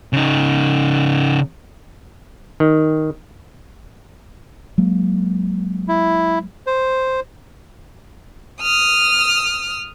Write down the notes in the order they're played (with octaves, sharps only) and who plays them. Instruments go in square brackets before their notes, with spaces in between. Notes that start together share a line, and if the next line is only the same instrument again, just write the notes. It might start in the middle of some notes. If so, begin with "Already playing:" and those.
[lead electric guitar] C#3 D#4
[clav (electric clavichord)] D#3
[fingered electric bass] F#3 G#3 A#3
[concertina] E4
C5
[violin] D#6 F6